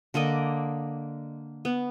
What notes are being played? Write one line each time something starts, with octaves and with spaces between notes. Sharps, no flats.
D3 A#3 D5 D#5
B3